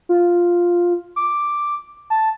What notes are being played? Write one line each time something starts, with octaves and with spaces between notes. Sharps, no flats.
F4
D6
A5